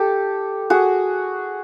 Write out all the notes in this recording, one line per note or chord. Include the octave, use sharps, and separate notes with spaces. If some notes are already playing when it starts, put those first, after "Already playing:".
Already playing: G4 A4
F#4 G#4